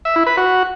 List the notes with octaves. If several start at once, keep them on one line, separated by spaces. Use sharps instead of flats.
E5
E4
B4
F#4